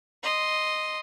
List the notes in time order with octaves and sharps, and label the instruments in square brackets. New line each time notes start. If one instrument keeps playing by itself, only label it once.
[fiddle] D#5 C6